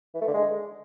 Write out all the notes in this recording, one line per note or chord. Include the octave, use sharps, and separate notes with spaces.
E3
A3
D3
G#3